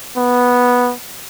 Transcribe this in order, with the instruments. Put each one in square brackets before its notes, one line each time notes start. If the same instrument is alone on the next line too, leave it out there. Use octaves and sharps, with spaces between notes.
[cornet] B3